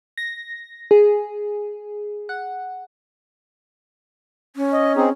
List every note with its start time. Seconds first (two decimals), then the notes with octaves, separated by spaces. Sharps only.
0.18 A#6
0.91 G#4
2.29 F#5
4.56 C#4
4.73 D#5
4.96 C4 D#4 G#4